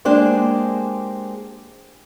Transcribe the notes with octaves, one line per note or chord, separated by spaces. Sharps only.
G#3 A#3 D4 G4 G#4 C5